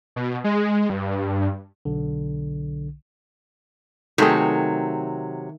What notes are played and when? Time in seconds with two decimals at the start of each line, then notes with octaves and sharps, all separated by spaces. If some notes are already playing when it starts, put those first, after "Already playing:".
0.16 B2
0.44 G#3
0.90 G2
1.85 B1 D3
4.18 C3 D#3 F#3 A3 G#4